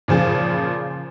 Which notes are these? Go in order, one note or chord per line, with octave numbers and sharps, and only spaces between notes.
A#2 C#3 F3 G#4